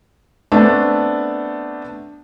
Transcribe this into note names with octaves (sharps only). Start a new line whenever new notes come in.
A3 B3 C4 D4